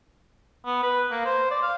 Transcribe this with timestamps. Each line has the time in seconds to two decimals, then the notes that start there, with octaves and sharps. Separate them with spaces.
0.65 B3
0.83 B4
1.11 A#3
1.25 C5
1.51 D5
1.63 F5